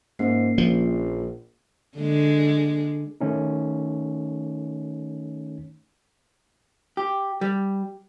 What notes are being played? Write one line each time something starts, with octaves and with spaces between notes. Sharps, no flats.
G#2 A#3 C#4 C7
A#1 F3
D3 G#3
D#3 A3 C#4 D#4
G4
G3